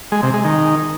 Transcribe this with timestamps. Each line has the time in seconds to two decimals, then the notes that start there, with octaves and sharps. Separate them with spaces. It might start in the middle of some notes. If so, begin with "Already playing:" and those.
0.12 G#3
0.23 C3
0.34 G#3
0.44 D#3